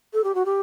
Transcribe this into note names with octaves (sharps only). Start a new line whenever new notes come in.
A4
G4
F#4
G4